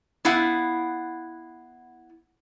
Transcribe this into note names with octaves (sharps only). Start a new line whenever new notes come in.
B3 E4 F5 F#5